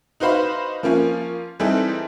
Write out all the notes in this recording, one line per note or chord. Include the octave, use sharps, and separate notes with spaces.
D#4 F#4 B4 C5 F5 B5
F3 A#3 C#4 F4
E3 G3 C4 D#4 G#4 A4